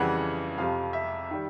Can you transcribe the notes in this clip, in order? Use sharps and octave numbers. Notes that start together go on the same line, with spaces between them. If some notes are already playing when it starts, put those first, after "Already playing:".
Already playing: F2 C#3 E3 G3 F#5
F2 C3 F3 F5
E5
D#3 G3